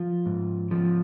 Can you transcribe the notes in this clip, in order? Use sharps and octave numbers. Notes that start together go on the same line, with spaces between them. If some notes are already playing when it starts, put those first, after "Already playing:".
Already playing: F3 F4
G#2
F3